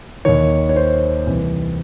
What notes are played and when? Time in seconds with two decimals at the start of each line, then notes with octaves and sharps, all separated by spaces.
0.25 D#2 D#3 C#5
0.69 C#5
0.76 C5
1.27 C2 C3 E3